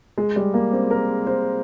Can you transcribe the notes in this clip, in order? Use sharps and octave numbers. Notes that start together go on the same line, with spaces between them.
G#3
G3
A#3
C4
A#4
C5